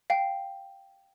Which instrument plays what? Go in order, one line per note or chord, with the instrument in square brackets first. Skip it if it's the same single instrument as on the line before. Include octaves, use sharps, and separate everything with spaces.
[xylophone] F5 G5